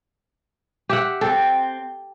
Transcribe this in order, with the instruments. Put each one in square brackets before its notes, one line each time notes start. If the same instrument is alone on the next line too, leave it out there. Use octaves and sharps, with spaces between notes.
[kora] G4 E5 F#5
[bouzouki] C4 [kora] A4